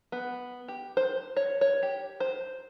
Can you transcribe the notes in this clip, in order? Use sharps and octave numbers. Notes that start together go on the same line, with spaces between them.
B3
G4
C5
C#5
C#5
G4
C5